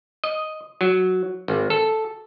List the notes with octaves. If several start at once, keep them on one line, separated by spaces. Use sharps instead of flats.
D#5
F#3
G#1
A4